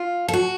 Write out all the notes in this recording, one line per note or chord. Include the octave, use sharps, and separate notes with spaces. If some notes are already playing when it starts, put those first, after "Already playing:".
Already playing: F4
A4
F#4